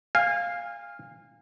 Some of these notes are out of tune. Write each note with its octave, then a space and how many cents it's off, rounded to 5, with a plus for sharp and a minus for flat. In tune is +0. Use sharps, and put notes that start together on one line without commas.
F5 +0 G#5 -30